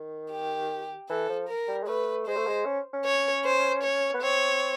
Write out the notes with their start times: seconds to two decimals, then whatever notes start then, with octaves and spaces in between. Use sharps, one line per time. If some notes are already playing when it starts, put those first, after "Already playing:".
Already playing: D#3
0.31 G4
1.09 E3 A4
1.29 F3
1.48 A#4
1.68 G3
1.83 G#3
1.87 A3 B4
2.27 G#3 C5
2.36 A3
2.46 G#3
2.65 C#4
2.93 C#4
3.05 C#5
3.44 C5
3.83 C#5
4.14 B3
4.22 C4 C#5